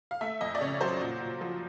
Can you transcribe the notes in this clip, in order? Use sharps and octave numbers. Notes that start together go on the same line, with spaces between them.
F5
A3 E5
F2 D#5
D5
C#3 C#5
F#3 C5
A#2
A#2
F3